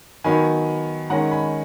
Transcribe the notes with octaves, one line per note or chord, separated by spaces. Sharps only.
D#3 F#3 B3 G#5 B5
D#3 G#3 C#4 F#5 A#5
G#5 B5